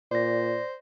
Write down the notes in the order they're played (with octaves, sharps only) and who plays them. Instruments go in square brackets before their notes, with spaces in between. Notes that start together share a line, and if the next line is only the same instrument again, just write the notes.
[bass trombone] A#2 [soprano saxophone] C5 [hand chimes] D5 A#6